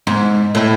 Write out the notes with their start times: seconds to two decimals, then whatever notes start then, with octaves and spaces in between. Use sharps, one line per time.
0.07 G#2
0.55 A2